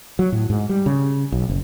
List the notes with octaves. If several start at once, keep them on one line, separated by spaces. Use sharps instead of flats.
F#3
A2
G#2
G3
C#3
B1
F#1